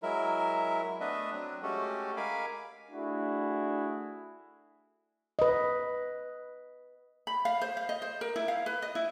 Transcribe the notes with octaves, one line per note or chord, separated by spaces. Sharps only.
F#3 G#3 E4 A#4 E5
A3 B3 D4 B4 D#5 E5
F#3 C4 D4
G#3 A3 C#4 F#4 G4 A4
G#3 A#4 F5 G#5 B5 D6
A3 D4 E4 F#4 G#4
B4 D#5
B5
F5
C5
F5
D#5
C5
A#4
E4
F5
B4
D#5
E4